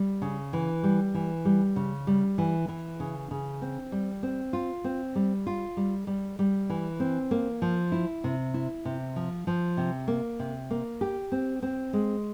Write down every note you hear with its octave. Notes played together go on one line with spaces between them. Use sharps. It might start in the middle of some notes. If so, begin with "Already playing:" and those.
Already playing: G3
C#3
E3
G3
E3
G3
C#3
G3
E3
E3
C#3
C#3
C4
G3
C4
F4
C4
G3
F4
G3
G3
G3
E3
C4
A#3
F3
E4
C3
E4
C3
F3
F3
C3
A#3
C3
A#3
G4
C4
C4
G#3